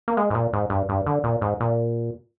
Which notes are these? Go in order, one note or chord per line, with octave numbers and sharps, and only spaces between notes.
A#3
G#3
G#2
A#2
G#2
G2
G2
D3
A#2
G#2
A#2